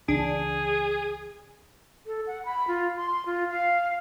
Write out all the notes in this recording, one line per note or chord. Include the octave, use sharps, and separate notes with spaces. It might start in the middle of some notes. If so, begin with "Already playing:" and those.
C#2 C#3 E3 D4 G#4
A4
F#5
B5
F4
C6
F4
F5